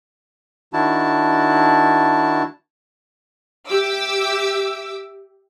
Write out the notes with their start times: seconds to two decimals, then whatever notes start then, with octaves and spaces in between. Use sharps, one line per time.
0.73 D#3 D4 E4 F#4 A5
3.68 G4 E5 D6 E6